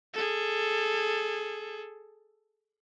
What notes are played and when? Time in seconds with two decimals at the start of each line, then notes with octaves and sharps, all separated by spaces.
0.14 G#4 A4